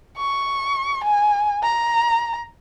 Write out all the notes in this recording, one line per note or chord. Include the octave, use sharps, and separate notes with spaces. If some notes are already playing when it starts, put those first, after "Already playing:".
C#6
G#5
A#5